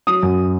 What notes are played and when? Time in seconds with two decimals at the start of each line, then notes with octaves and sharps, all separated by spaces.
0.07 F#3 D#6
0.23 F#2